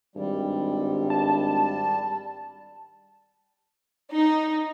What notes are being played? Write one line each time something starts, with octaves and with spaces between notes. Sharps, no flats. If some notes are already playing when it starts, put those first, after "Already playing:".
G#1 G2 G3
A5
D#4